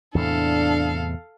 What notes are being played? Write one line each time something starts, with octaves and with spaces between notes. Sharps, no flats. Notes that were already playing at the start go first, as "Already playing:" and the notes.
E2 A2 C3 D4 A4 F5